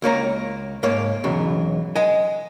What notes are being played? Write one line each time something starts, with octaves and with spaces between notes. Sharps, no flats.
C#2 A#3 C#5 A#5
G#2 A#3 C#5
B1 E2 C#3 F#3
D#5 G#5